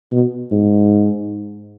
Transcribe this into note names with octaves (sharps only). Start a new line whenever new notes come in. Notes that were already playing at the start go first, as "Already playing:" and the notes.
B2
G#2